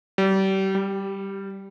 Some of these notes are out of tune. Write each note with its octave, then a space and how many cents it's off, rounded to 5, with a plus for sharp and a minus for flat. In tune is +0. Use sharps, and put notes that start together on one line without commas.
G3 -30
G3 +0